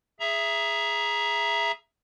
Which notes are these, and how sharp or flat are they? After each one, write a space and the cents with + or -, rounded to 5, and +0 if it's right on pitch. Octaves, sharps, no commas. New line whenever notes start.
G#4 +0 E5 +15 A#5 +20